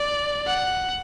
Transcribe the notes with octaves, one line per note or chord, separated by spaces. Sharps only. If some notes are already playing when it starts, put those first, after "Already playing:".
Already playing: D5
F#5